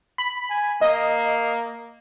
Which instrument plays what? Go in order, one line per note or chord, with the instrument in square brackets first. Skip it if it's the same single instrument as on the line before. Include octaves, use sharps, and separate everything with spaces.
[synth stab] B5
[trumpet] G#5
[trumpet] A#3 [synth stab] D#5